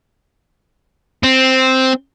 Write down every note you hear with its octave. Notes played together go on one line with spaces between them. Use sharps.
C4